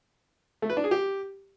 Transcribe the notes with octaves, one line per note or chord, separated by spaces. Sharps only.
A3
B4
D4
G#4
G4